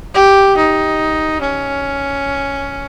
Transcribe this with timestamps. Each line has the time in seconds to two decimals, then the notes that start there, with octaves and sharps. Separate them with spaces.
0.14 G4
0.57 D#4
1.41 C#4